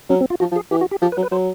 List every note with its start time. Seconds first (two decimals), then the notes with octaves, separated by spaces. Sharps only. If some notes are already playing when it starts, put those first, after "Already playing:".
0.10 F#3 C#4
0.21 C4
0.30 F4
0.40 F3 F#4
0.51 F3
0.56 G#4
0.71 E3 G4
0.81 F#4
0.91 G4
1.02 F3 G4
1.12 B4
1.17 F#3
1.23 B4
1.32 F#3 C5